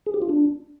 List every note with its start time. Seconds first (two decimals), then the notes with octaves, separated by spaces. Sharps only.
0.06 G#4
0.14 G4
0.22 F4
0.29 D4